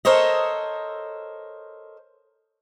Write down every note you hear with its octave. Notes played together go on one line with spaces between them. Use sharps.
A4 A#4 C5 C#5 D#5